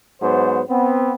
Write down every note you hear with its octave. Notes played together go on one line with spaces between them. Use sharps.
G#2 F#3 B3 C5
B3 C4